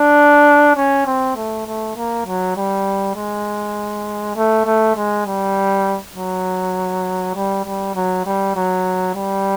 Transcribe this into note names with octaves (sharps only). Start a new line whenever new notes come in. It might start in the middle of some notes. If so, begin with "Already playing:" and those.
Already playing: D4
C#4
C4
A3
A3
A#3
F#3
G3
G#3
A3
A3
G#3
G3
F#3
G3
G3
F#3
G3
F#3
G3